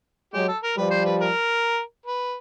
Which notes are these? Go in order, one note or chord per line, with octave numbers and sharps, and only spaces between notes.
F#3 G#3 G4
A4
A#4
F3 G3 B4
C5
B4
A#4
B4